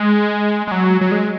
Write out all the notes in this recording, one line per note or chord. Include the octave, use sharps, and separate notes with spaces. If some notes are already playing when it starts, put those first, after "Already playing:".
Already playing: G#3
G#3
F#3
F#3
G#3